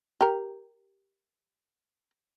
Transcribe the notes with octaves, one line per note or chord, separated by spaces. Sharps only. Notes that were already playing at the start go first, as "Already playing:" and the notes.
G4 A#4